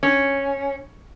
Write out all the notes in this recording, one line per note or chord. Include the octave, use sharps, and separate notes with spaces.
C#4